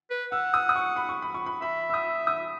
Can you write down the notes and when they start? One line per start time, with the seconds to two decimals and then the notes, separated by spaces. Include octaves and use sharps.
0.11 B4
0.32 F#5 E6
0.54 D#6
0.69 D#6
0.76 C#6
0.96 B5
1.09 C#6
1.22 B5
1.34 C#6
1.46 B5
1.62 E5 B5
1.90 E6
1.94 D#6
2.27 D#6